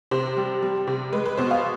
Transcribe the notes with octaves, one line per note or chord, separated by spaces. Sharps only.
C3 C5
G3
G3
C3
G#3 B4
B4
B2 C5
F5